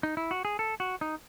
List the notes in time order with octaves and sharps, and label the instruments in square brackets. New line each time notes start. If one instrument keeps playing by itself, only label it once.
[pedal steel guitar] D#4
E4
F#4
G#4
A4
F#4
D#4